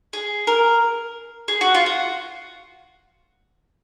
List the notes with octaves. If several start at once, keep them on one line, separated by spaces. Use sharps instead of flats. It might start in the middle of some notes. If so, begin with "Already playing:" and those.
G#4
A#4
G#4
F#4
F4
F#4